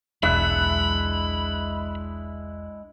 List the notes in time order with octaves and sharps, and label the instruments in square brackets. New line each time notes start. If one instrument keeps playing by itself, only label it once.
[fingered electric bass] E1 B1 [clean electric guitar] G#3 D4 E4 [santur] E5 F#5 [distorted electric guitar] B5